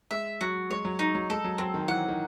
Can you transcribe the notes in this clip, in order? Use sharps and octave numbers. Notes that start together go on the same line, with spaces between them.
G#3 E5
F#3 F#4
G#3 C#5
F#3
D#4
F#3
G#3 A4
F#3
F#3 C4
D#3
E3 F#5
D#3